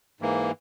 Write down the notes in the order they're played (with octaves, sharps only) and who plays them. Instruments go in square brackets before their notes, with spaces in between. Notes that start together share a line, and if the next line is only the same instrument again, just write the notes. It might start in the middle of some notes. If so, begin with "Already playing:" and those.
[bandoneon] G#2 E3 A#3